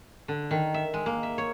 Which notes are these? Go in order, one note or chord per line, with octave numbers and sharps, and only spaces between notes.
D3
D#3
E5
G#3
A#3
E5
C#5